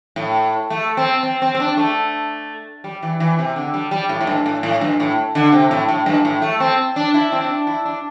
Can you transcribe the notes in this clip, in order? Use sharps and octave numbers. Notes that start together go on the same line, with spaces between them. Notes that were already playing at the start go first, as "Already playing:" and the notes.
A2
A3
C4
C4
C4
C4
D4
A3
G3
E3
E3
C3
D3
G3
G3
A2
A2
G2
A2
A2
G2
A2
D3
C3
A2
A2
G2
A2
A3
C4
D4
E4
C4
D4
E4
D4